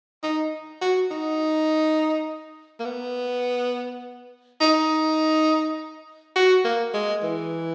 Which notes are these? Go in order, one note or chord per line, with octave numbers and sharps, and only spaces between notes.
D#4
F#4
D#4
A#3
B3
D#4
F#4
A#3
G#3
E3